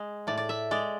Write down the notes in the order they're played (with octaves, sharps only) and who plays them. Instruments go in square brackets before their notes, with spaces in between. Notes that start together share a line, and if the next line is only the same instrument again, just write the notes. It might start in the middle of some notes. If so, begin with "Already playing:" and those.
Already playing: [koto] G#3
A2 D5
D5
E5
G#3 D5